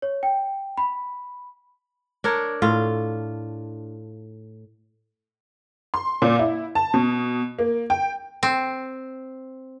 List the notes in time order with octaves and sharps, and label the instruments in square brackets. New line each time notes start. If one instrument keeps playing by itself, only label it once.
[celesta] C#5
G5
B5
[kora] D4 A#4 C#5
A2 F4
[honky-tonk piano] C6
A#2
E4
A5
B2
A#3
G5
[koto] C4